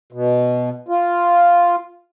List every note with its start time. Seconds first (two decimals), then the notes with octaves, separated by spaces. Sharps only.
0.12 B2
0.88 F4